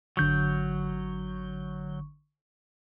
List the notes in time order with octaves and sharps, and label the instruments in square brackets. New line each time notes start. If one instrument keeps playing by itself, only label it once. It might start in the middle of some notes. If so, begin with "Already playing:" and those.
[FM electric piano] G#1 D3 C#6 [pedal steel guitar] F#3 G6